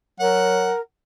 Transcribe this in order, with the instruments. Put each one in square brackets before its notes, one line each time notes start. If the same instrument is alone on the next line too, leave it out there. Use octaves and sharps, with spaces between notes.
[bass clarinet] F#3 [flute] A#4 [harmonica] F#5